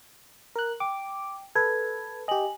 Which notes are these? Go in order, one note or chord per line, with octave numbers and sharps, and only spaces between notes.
A#4 F#6
G5 D6
A4 B4 G#6
G4 D#5 G#5 F#7